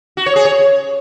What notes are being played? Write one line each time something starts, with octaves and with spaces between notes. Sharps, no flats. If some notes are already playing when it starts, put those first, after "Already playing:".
F#4
C#5
G#4
C#5